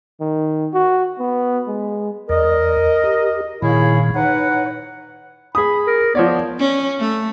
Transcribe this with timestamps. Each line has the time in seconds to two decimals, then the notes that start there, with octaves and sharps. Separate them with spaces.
0.20 D#3
0.74 F#4
1.19 B3
1.67 G#3
2.29 E2 A#4 D5 D#5
3.04 G4
3.62 A#2 D#3 E4 G#4 C#5 F5
4.16 D#4 B4 C#5 F#5
5.55 G#4 B5 D#6
5.87 A#4
6.15 F3 B3 C#5 D5
6.59 C#4
7.00 A3